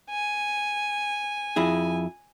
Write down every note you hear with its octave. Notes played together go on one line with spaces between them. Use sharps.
G#5
F2 E4 G#4